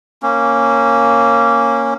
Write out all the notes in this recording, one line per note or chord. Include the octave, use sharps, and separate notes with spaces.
A#3 C#4